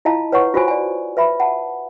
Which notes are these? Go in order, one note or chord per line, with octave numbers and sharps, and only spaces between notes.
E4 F4 D#5 F5 A5 A#5
B4 C#5 F#5 C#6
F4 F#4 C5 G#5
D5 G#5
B4 E5 B5
F#5 A5